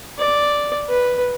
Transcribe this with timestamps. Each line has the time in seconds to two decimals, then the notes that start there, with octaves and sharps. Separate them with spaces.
0.19 D5
0.90 B4